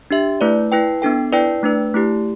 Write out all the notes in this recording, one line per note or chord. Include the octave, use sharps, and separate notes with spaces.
D4 G4 E5
A3 E4 B4 D5
E4 B4 G5
B3 D4 A4 G5
E4 B4 D5 G5
A3 D4 B4
A3 E4 G4